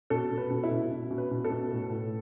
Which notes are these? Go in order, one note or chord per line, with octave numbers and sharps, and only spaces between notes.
B2 A4
B2
B4
B2
E4
B2
B2
B2
B4
B2
A4
B2
A2
A2